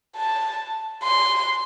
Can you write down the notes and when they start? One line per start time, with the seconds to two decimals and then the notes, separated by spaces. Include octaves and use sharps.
0.16 A5
1.03 C6